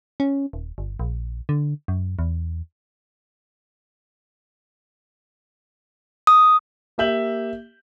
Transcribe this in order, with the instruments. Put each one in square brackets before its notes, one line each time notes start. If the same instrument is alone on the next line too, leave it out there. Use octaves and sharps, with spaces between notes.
[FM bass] C#4
D#1
G1
A#1
D3
F#2
E2
[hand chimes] D#6
[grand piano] A#3 G4 E5 G6 F#7